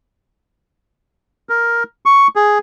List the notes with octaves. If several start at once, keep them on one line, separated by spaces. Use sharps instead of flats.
A#4
C#6
G#4